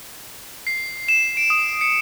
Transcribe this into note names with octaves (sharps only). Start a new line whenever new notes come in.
C7
E7
D7
D#6
C#7